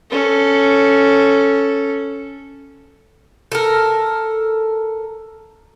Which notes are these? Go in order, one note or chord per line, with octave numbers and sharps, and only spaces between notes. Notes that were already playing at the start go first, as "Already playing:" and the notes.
C#4 A4
A4 A#4